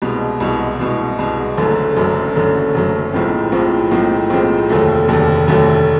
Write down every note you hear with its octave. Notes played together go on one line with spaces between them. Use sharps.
C2 B2 G#3
C2 B2 G#3
C2 B2 G#3
C2 B2 G#3
F#1 F#2 D3 F#3 A3
F#1 F#2 D3 F#3 A3
F#1 F#2 D3 F#3 A3
F#1 F#2 D3 F#3 A3
B1 A2 F3 G#3 C4
B1 A2 F3 G#3 C4
B1 A2 F3 G#3 C4
B1 A2 F3 G#3 C4
F1 D#2 D3 F#3 A3
F1 D#2 D3 F#3 A3
F1 D#2 D3 F#3 A3